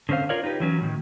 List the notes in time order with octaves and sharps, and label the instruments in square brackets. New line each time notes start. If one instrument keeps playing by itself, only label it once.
[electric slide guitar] D3 C4 C#4 C5 F5
F4 A#4 C#5 D5 F5
D#4 F4 G4 B4
E3 F#3 C#4
A2 D#3